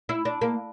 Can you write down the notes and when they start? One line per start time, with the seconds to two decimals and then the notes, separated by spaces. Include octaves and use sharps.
0.09 E4
0.25 D4
0.42 A#3